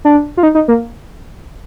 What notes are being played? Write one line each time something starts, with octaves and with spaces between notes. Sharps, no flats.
D4
F4
D#4
D#4
A#3